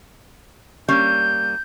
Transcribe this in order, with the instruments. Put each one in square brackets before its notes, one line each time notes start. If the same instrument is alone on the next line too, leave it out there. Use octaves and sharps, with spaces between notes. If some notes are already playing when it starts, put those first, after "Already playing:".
[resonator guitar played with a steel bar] G3 A#3 C#4 [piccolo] G6